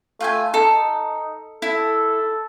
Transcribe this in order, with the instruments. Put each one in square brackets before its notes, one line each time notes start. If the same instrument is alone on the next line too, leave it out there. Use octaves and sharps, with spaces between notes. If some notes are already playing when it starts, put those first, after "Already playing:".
[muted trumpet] A3 [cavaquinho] F4 G5 G#5
[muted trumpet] D#4 [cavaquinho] A4
[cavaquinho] E4 [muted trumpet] A4